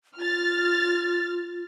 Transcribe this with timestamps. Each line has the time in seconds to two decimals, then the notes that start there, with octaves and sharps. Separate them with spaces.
0.18 F4 F6 A6